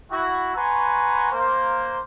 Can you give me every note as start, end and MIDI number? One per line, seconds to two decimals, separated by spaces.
0.10 0.54 64
0.10 0.54 66
0.55 1.27 71
0.55 1.27 78
0.55 1.27 80
0.55 1.27 82
0.55 1.27 84
0.55 1.27 85
1.32 2.00 58
1.32 2.00 72